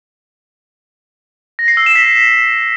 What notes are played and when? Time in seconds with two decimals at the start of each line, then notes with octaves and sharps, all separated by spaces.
1.59 A#6
1.68 C7
1.77 E6
1.86 E7
1.95 B6